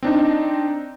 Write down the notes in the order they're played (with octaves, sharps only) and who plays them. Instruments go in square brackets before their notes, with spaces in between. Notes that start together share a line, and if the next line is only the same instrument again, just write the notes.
[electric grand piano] C4 D4 D#4